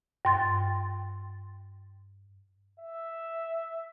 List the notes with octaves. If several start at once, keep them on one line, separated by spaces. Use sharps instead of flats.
G2 C6 A6
E5